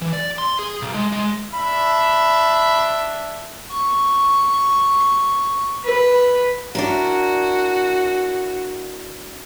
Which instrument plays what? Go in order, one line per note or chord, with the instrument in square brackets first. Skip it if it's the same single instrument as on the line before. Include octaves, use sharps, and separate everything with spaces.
[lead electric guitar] E3
D5
C6
G#4
B1
G#3
G#3
[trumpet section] D4 E5 [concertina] B5
[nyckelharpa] C#6
B4
[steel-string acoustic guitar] D4 E4 A#4 [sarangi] F#4